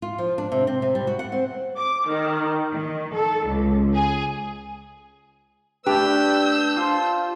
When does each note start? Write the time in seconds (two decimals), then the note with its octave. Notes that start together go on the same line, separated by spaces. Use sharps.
0.02 F4
0.18 F3
0.38 D4
0.52 C3
0.67 C4
0.82 C3
0.95 G3
1.07 F#4
1.19 F#5
1.32 C4
1.77 D6
2.08 D#3
2.72 D#3
3.15 A4
3.50 C#2
3.94 G#4
5.86 A3 D4 G4 B4 E6 G6
6.77 F4 C5 A5 C6